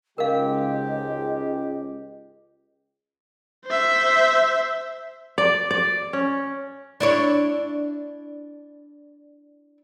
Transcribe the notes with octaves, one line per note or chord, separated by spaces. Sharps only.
C#2 G#2 G#3 G4 A#4 D#5 F5
C5 E5
D5
D5
C#4
D4 E4 C#5